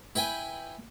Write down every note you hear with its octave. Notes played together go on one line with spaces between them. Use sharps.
E4 B4 G5 G#5